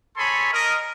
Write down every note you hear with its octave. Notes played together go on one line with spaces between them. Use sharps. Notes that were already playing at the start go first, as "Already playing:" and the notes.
G#4 A4 C#5 G#5 B5 C6
A#4 D#5